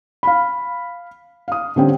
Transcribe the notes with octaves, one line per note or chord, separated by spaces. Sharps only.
F5 B5
F5 D#6
D3 G3 C4 C#4 G4 G5